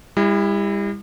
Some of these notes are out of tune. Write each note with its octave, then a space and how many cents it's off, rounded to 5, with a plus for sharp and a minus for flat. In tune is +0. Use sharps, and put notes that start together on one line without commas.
G3 +40 E4 +0